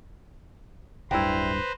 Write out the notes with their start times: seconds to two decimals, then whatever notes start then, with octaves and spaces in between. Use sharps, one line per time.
1.11 D1 G2 E4 B4 C5 D5 G5 A#5